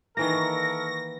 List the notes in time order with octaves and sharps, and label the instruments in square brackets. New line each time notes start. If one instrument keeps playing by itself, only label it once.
[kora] D#3 E3 A#3 [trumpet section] A4 A#4 C#6 [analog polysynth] A#6